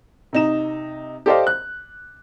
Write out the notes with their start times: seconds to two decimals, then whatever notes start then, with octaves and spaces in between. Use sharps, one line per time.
0.33 C3 D#4 E7
1.26 G4 A4 C5 D5 D#5 F5
1.47 F#6